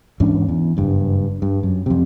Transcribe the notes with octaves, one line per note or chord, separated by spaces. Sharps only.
E2 G#2 C#4 D4
E2
F#1 G2
G2
F#2
F2 C3